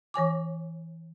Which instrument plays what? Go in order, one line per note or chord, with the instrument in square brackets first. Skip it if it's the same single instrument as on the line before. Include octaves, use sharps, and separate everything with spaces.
[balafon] E3 C#5 G#5 D6